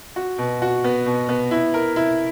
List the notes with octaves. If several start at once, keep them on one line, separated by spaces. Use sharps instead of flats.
F#4
B2
F#4
B3
B2
B3
E4
A#4
E4